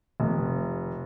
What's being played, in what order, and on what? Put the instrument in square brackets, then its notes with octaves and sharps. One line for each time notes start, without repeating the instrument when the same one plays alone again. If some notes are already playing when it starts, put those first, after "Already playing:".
[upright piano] F1